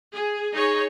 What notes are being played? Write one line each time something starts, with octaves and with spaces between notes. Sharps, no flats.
G#4
D#4 G#4 C#5